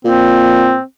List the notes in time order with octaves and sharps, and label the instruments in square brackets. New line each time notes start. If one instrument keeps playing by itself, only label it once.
[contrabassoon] A#2 [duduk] C4